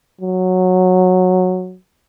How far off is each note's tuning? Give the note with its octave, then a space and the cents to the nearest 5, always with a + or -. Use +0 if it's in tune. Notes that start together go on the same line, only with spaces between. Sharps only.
F#3 -10